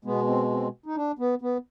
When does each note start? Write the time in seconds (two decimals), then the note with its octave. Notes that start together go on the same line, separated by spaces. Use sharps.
0.05 B2 G#3 B3
0.27 C4
0.51 C4
0.86 D#4
0.96 D4
1.19 B3
1.42 B3